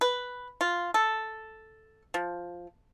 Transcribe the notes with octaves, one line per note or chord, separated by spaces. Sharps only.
B4
F4
A4
F3